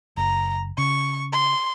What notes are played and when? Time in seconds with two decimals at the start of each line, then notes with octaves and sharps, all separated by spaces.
0.17 F#1 A#5
0.78 C#3 C#6
1.32 C6